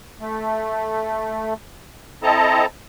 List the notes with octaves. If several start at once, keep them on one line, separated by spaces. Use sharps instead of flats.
A3
C4 E4 A4 D#5 A5 A#5